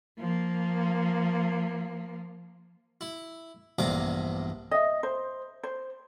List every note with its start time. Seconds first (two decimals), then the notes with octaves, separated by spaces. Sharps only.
0.19 F3 A#3
3.01 E4
3.79 A#1 E2 G2 C3 A#5 D6
4.71 D#5 E5
5.03 C5
5.63 C5